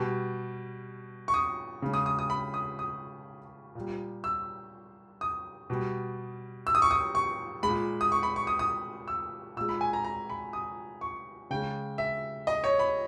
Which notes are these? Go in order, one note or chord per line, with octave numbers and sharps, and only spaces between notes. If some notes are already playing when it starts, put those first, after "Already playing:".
Already playing: B2 G3
C#6
D#6
C#3 G#3
D#6
D#6
D#6
B5
D#6
D#6
A#2 G3
E6
D#6
B2 G3
E6
D#6
C#6
D#6
C#6
A#2 G#3 B5
D#6
C#6
B5
C#6
D#6
D#6
E6
A#2 G#3 E6
B5
G#5
A#5
A#5
B5
D#6
C#6
C#3 G#3 G5
E5
D#5
C#5
B5